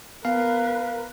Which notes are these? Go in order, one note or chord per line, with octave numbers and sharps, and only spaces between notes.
B3 A#4 B4 F5